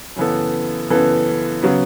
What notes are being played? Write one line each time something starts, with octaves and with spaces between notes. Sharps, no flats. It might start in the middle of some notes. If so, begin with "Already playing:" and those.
F#2 C#3 E3 B3 A4
F#2 C#3 E3 B3 A4
C#3 F#3 B3